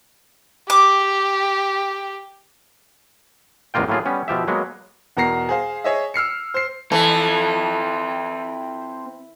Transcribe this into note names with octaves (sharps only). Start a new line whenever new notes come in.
G4 D6
A1 E2 G#3 A#3 F4 G5
A2 F#3 A#3 F4 G#4
G3 B3 C#4
B2 F3 G4 E5
F#3 G#3 A#3 B3
E2 B2 A#4 A#5 A#6 C7
G#4 C5 F5
G#4 C#5 D#5 E5
E6 F6 C7 C#7
C5 C7
E3 C4 A4